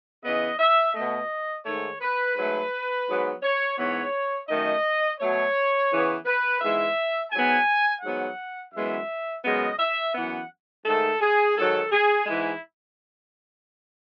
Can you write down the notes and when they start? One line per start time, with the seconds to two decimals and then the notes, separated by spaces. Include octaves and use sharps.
0.24 C#3 E3 B3 D#5
0.59 E5
0.94 B2 A3 D#5
1.65 G#2 D#3 A3 C#5
2.01 B4
2.36 G#2 F#3 A3 B4
3.07 G#2 F#3 B3
3.43 C#5
3.77 G#2 E3 B3 C#5
4.49 F#2 D#3 A3 D#5
5.18 B2 F#3 A3 C#5
5.89 C#3 E3 B3
6.25 B4
6.60 G#2 E3 G#3 B3 E5
7.31 G#2 F#3 B3 G#5
8.02 G#2 F#3 B3 F#5
8.73 F#2 E3 G#3 B3 E5
9.43 F#2 C#3 G#3 B3 D#5
9.79 E5
10.14 F#2 E3 B3 F#5
10.85 G#2 D#3 A3 A4
11.21 G#4
11.56 G#2 D#3 F#3 A4
11.91 G#4
12.26 G#2 E3 G#3 E4